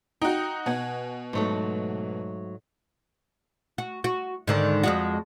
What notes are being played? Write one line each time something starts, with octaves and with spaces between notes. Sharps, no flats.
D#4 F#4 G5
B2 D#5 F#5 G#5
G#2 F#3 A3
F#4
F#4
G#2 D3 D#3
F2 G#3 F#4